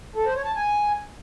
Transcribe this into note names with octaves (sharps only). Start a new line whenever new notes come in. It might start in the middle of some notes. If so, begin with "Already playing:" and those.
A4
C5
C#5
A5
G#5